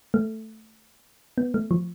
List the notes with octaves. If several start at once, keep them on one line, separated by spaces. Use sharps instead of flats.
A3
B3
A3
F3